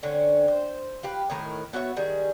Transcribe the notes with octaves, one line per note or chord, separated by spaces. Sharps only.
D3 C4 C#4
C5
F4 G4 B4
A2 D#3 A#4 B4
B3 F#4 C#5 E5
D#3 G3 G#4